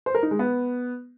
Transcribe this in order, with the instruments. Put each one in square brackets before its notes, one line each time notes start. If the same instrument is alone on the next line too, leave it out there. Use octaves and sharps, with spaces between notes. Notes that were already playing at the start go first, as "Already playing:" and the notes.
[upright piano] C5
A#4
D#4
G#3
B3